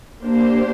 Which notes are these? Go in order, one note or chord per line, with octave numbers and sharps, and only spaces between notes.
A#3 D4 G4 C5